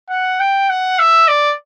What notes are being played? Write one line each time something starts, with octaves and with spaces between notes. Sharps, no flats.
F#5
G5
F#5
E5
D5